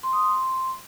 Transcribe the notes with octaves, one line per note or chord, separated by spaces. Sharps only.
C6
D#6
C6